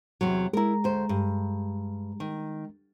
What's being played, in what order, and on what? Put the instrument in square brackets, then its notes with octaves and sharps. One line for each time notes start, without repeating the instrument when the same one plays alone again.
[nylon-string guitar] E2 C3 F#3
[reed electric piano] G#3 A#5 [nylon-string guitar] E4 A#4
[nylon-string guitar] D2 C5
G2
D#3